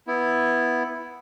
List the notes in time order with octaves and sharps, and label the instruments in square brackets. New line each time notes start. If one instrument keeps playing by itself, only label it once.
[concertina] B3 E4